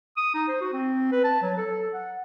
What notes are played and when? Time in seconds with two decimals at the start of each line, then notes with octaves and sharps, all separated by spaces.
0.17 D#6
0.34 D#4
0.48 C5
0.61 F#4
0.73 C4
1.12 B4
1.24 A5
1.42 F#3
1.57 A4
1.93 F#5